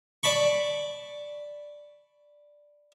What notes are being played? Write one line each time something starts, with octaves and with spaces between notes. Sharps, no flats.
D5 A5 B5 C#6